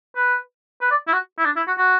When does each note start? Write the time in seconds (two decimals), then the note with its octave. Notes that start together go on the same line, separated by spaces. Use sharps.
0.16 B4
0.81 B4
0.91 D5
1.08 E4
1.13 F#4
1.38 E4
1.45 D4
1.56 E4
1.68 F#4
1.78 F#4